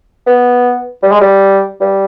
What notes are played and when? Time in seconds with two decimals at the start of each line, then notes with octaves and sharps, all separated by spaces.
0.27 B3
1.03 G3
1.12 G#3
1.21 G3
1.81 G3